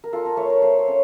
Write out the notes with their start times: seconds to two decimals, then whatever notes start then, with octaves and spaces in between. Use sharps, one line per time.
0.04 A#4
0.13 F4 A4
0.25 A#4
0.37 A3 C#5
0.50 A#4
0.62 A3 C5
0.79 C#5
0.88 C#4